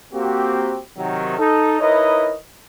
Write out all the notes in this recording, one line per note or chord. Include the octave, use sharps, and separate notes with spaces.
A#3 C4 F#4 G4
C3 D#3 F#3
D#4 A4
D#4 E4 A#4 B4 C#5 D#5